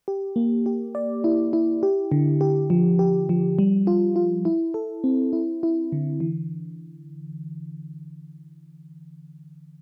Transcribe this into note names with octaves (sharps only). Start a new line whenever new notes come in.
G4
A#3
G4
D5
E4
E4
G4
D3
G4
F3
G4
F3
G3
F4
F4
E4
A4
C4
E4
E4
D3
E3